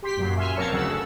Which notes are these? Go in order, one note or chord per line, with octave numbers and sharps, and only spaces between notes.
G4 C6 B6
F#2 A#2 F#3
F#2 E5 G#5 C6 F6
F3 C4 A#4 C#5 A5 C#7
D2 C#3 F#3 F#5 E6
A4